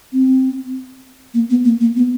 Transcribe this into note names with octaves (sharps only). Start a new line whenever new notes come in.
C4
A#3
B3
A#3
A#3
B3